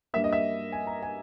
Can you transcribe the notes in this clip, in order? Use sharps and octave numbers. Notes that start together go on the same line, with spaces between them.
G2 G3 A#3 E5
D#5
E5
G#5
A#5
G#5